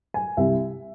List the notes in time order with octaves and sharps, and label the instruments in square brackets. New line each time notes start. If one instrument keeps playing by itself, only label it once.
[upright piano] G#5
C2 E5